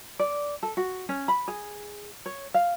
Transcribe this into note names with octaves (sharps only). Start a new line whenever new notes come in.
D5
A4
F#4
C#4
B5
G#4
C#5
F5